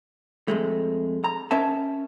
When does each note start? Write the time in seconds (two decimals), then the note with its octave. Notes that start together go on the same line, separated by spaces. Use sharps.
0.48 F2 G#3 A3
1.24 A#5
1.51 C#4 A#4 D#5 E5 A5